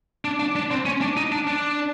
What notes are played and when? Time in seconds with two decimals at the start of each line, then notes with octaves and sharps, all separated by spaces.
0.25 D4
0.40 D4
0.56 D4
0.71 C4
0.86 C#4
1.01 D4
1.17 D#4
1.32 D4
1.47 D4